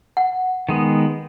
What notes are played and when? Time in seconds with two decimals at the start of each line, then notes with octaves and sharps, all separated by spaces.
0.17 F#5
0.69 D#3 G#3 B3